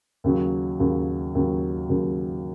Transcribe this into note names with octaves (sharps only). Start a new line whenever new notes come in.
D#2 C#3 F#3
D#2 C#3 F#3
D#2 C#3 F#3
D#2 C#3 F#3